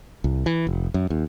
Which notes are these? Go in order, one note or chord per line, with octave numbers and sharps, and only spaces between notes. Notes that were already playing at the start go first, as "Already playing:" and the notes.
C2
E3
F1
F#2
D#2